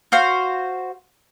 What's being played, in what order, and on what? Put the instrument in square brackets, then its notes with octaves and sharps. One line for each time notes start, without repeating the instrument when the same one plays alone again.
[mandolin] F#4 C5 F5